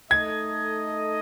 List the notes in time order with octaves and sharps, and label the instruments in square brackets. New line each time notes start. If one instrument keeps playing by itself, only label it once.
[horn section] A3 D#4 A4 D#5 [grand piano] G#6